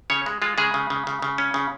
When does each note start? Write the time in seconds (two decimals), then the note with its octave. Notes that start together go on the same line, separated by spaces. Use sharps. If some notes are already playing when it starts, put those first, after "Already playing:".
0.10 C#3 C#4 C#5
0.26 G#3
0.42 G#3 F4
0.58 C#3 G#3 G#4
0.74 C#3
0.90 C#3
1.07 C#3
1.22 C#3
1.38 C#4
1.54 C#3